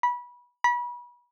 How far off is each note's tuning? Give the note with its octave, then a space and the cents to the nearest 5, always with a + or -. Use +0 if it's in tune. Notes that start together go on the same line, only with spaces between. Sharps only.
B5 -20
B5 -30